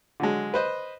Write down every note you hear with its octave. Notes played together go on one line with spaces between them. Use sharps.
D3 F#3 G#3
B4 C5 D#5